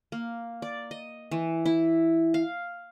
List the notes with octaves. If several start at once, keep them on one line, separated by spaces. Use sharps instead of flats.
A#3
D5
D#5
E3
E4
F5